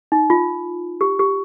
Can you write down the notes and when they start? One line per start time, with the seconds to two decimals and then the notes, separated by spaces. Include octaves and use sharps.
0.12 D#4
0.30 F4
1.01 G4
1.19 G4